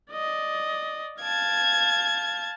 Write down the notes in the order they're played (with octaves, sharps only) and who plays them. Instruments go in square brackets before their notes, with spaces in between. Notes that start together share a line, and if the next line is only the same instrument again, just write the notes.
[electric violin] D5 D#5
[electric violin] F5 A5 [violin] G#6